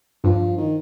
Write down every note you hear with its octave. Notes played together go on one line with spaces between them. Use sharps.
G2 F3
D#3